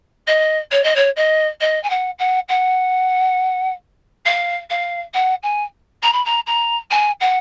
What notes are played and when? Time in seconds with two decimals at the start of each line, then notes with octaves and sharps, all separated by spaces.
0.27 D#5
0.71 C#5
0.84 D#5
0.95 C#5
1.16 D#5
1.60 D#5
1.83 G#5
1.89 F#5
2.18 F#5
2.48 F#5
4.25 F5
4.70 F5
5.13 F#5
5.43 G#5
6.02 A#5
6.13 B5
6.25 A#5
6.46 A#5
6.90 G#5
7.20 F#5